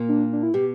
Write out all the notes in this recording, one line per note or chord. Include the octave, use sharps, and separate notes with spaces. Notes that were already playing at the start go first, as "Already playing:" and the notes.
Already playing: A#2 A#3
D4
D4
E4
B2 G4